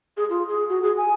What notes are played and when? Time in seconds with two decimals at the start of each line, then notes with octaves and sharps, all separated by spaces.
0.17 G#4
0.30 F4
0.48 G#4
0.69 F#4
0.83 G#4
0.97 G#5